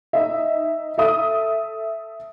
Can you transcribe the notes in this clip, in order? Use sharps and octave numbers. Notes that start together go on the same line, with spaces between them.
D#4 D#5 E5
A4 E5 D#6